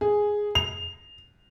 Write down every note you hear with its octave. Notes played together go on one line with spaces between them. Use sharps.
G#4
F7